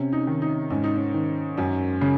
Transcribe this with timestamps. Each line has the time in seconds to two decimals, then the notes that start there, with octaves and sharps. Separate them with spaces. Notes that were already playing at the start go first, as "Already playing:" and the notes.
Already playing: C3 C#4
0.13 D#4
0.27 D#3
0.42 D#4
0.70 G#2 C#4
0.84 D#4
0.96 C#4
1.14 D#3
1.57 F#2 C#4
2.01 C#3 C#4